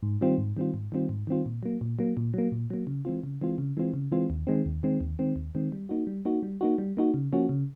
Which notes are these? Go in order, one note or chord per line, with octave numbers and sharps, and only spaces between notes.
G#2
D#3 G3 C4 F4
G#2
D#3 G3 C4 F4
G#2
D#3 G3 C4 F4
G#2
D#3 G3 C4 F4
A#2
F#3 A#3
A#2
F#3 A#3
A#2
F#3 A#3
A#2
F#3 A#3
C#3
E3 G#3 C4 F4
C#3
E3 G#3 C4 F4
C#3
E3 G#3 C4 F4
C#3
E3 G#3 C4 F4
D#2
D#3 G#3 C4
D#2
D#3 G#3 C4
D#2
D#3 G#3 C4
D#2
D#3 G#3 C4
G3
A#3 D#4 F#4
G3
A#3 D#4 F#4
G3
A#3 D#4 F#4
G3
A#3 D#4 F#4
C#3
F3 A#3 C#4 F#4
C#3